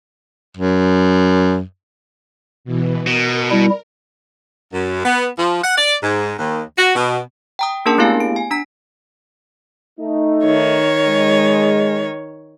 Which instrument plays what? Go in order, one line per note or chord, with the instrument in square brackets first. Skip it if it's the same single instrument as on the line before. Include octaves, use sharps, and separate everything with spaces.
[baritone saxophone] F#2
[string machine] B2 E3
[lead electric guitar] B2 [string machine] A#4
[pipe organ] G3 E4
[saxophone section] F#2
B3
F3
F#5
D5
G#2
D#2
F#4
B2
[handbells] G5 A#5 D#6
A#3 C#4 D4 G#4 A#4 A5
A3 B3 E4 G4 F5 G#5
D7
G#5
D4 A#5 B6
[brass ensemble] A3 D#4
[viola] D#3 C#5
[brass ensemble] G#3